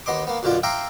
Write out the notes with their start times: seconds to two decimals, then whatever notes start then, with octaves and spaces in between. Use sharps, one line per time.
0.06 D#2 B3 D#5 C6 D6
0.27 A#3 B3
0.43 F#2 B2 D3 F4 D5
0.63 E5 F5 G5 A#5 C6 D6